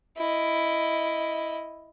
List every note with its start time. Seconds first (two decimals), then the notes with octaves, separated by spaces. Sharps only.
0.17 E4 D#5